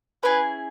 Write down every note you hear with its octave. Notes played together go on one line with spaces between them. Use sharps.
C#4 E4 G#4 B4